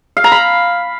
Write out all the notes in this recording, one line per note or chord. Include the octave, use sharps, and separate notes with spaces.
F5
A#5
B5